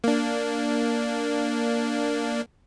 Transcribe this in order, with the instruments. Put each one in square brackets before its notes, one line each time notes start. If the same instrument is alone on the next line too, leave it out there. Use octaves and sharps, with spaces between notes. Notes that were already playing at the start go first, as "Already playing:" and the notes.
[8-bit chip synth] A#3 D4